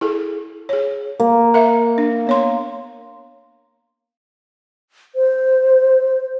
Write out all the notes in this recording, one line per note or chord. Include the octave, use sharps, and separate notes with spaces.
E4 G#4 A4
G#4 C#5
A#3
A#4 E5 F5
D4
B3 C#5 C6
C5